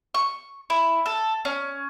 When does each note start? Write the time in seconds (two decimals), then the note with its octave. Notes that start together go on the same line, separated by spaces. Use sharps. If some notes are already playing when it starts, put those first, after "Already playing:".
0.14 C#6
0.70 E4
1.06 A4
1.45 C#4